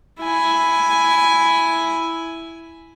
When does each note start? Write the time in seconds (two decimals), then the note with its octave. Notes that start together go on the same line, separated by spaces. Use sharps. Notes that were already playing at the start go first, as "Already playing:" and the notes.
0.20 E4 G#5